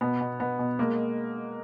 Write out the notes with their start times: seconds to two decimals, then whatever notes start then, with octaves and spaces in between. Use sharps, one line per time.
0.01 B2 B3
0.21 B2
0.40 B2 B3
0.59 B2
0.79 G#3 A#3